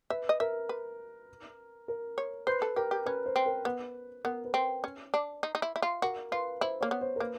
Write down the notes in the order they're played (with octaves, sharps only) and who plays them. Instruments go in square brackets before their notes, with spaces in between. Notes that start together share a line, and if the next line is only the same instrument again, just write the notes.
[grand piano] B4 [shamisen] E5
[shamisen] D#5
[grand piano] A#4 [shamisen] E5
[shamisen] B4
[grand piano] A#4
[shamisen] C#5
[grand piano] B4 [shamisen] C5
[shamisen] A4
[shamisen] G4 [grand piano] A#4
[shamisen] G4
[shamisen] C#4 [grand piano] B4
[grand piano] C5
[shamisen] C4
[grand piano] A#4
[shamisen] B3 [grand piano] B4
[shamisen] B3 [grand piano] A#4
[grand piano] B4
[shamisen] C4
C#4
D4
D#4
D#4
E4
E4
F4
[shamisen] F#4 [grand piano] A#4
[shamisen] F4 [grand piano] B4
[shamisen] E4 [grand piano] C5
[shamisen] A#3 [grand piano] C#5
[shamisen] B3
[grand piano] C5
A#4
[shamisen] A#3 [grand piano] B4